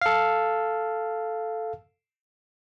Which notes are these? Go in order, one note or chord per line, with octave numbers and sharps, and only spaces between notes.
A4 F5